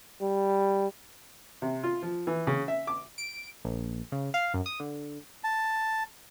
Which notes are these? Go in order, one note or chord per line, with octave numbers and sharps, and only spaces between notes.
G3
C3
F4
F3
E3
C#3
E5
D6
D7
A#1
C#3
F5
F#2
D#6
D3
A5